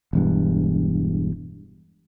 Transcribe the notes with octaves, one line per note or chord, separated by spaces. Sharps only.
E1 E2 G2